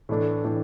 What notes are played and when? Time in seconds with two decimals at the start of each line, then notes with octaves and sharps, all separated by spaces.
0.09 A2 E3 A3 D4
0.44 A2 E3 A3 D4